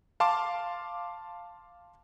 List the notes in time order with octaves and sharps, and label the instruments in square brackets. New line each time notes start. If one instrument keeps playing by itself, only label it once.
[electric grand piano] F5 A5 C6 D6